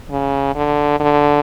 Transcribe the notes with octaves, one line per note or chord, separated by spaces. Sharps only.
C#3
D3
D3